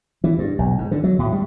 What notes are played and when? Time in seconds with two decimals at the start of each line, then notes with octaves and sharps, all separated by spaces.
0.24 E3
0.39 G2
0.58 B1
0.78 G#2
0.91 D3
1.04 F#3
1.19 A2
1.33 G3